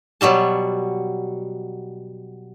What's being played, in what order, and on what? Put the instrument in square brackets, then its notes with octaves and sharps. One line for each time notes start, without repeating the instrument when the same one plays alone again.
[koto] B2 F#3 G3 A5